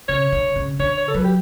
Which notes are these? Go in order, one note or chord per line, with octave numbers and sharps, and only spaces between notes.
C#3 C#5
D3
C#3
D3 C#5
C#5
A4
F#3 B4
G4